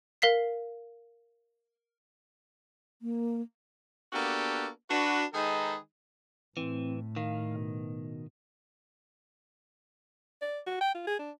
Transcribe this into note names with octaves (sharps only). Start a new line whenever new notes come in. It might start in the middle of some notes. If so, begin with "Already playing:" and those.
A#4 F5 B6 C7
A#3
A#3 B3 D4 F#4 G4 A4
D4 F#4 B4
D#3 G#3 D#4 G#4 A4 B4
A2 E3 C4
D#3 F5
B2
D5
F#4
G5
F4
G#4
D4